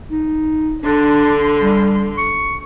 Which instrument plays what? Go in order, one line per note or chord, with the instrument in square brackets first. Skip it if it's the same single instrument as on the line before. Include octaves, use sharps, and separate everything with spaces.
[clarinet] D#4
[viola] D3 C6 [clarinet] D4
[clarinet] G3
C#6